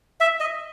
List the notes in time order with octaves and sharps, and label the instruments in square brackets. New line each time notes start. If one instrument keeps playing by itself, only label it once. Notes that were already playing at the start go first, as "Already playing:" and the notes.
[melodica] E5
D#5